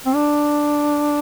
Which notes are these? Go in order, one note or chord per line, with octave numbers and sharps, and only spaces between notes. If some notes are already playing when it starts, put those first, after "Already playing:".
C4
D4